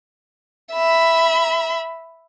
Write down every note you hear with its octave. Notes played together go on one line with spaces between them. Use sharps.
E5 B5